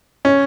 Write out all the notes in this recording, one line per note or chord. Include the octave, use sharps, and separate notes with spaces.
C#4